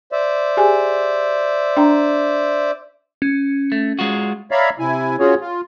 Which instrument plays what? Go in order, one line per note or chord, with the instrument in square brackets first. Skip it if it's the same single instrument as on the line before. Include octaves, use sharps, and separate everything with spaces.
[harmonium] C5 D5 E5
[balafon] G4 G#4 G#5
D4 G5 A#5
[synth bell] C#4
[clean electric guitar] A3
G#3 F4 F#4
[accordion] C#5 D5 E5 F5 A#5 B5
C3 E4 G#5
C#4 F4 F#4 G#4 C#5
F4